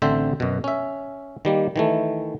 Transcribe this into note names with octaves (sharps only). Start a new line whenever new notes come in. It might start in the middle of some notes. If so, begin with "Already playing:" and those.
A1 D3 C4 C5 E5
F#2 B2
C#4 E5
D#3 G3 A#3
D#3 E3 A3